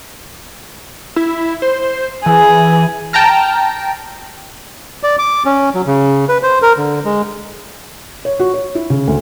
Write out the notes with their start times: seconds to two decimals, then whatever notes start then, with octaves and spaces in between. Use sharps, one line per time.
1.16 E4
1.62 C5
2.26 E3 G#4
3.13 G5 A5 A#5 F6
5.03 D5
5.19 D6
5.46 C#4
5.74 F#3
5.86 C#3
6.29 B4
6.43 C5
6.62 A#4
6.77 D3
7.05 G#3
8.25 C#5
8.40 F#4
8.54 C#5
8.75 E4
8.90 C#3
9.08 D2